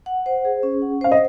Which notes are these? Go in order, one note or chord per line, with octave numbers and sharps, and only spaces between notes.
F#5
C5
G#4
C#4
F#5
C5 F5
D#5